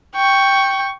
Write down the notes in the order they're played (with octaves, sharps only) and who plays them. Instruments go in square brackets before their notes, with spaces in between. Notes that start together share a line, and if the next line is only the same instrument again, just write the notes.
[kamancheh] G5 C#6